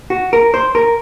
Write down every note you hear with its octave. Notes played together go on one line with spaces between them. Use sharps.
F#4
A#4
C5
A#4